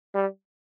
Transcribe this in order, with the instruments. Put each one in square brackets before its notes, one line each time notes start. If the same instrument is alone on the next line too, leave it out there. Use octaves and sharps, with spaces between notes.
[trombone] G3